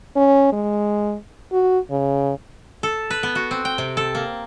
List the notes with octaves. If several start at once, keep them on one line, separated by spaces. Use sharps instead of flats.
C#4
G#3
F#4
C#3
A4
B4
B3
F#4
C4
G5
C3
A4
A#3